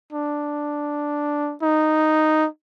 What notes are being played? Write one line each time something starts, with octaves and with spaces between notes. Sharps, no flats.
D4
D#4